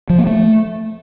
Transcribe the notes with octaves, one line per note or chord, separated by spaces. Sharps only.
F3
A#3
A3